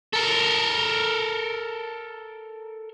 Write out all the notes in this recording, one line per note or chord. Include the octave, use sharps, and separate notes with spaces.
A4 A#4